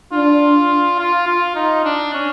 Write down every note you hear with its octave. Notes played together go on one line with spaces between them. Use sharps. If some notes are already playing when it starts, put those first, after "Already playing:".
D4 F4
F4
F4
D#4
D4
C#4